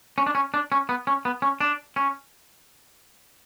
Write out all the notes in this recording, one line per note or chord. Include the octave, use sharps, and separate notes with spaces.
C#4
D4
C#4
D4
C#4
B3
C#4
B3
C#4
D4
C#4